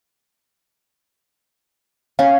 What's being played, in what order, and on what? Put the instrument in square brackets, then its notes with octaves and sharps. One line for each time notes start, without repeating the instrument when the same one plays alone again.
[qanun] C#4 [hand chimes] F5